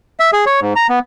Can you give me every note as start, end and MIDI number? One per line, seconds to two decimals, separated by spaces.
0.20 0.31 76
0.33 0.45 68
0.46 0.60 73
0.61 0.73 44
0.76 0.87 82
0.89 0.99 59